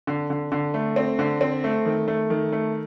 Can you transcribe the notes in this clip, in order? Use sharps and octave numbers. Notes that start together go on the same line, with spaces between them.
D3
D3
D3
A3
C4
D3
C4
A3
D#3
A3
D#3
A3